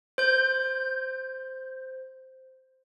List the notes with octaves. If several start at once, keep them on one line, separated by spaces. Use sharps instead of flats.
C5 G6